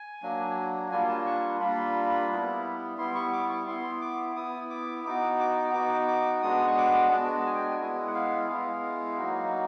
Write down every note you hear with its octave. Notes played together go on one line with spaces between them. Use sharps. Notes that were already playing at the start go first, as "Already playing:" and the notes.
Already playing: G#5
F#3 A#3 D4
G3 A#3 D4 F4 G#5
A5
C#6
G3 A#3 D4 F4 B5
G3 B3 E4
G3 B3 E4 C6
C#6
D6
C#6
B3 E4 C6
D6
B3 E4 D#6
D6
B3 D#4 F#4 D6
D6
B3 D#4 F#4 D6
D6
G#3 B3 D4 F#4 D#6
C#6
D6
G#3 B3 D4 F#4 A5
G#5
G5
G#5
G#3 B3 E4
F#5
F5
G#3 B3 E4 F5
F#3 A#3 D#4 F#4